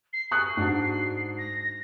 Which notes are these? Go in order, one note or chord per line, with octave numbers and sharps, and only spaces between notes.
C7
C#6 D#6 F#6 C7
G#2 D4 F#4
A#6